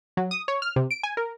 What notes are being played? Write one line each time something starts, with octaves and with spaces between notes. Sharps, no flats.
F#3
D#6
C#5
F6
C3
D7
G#5
A#4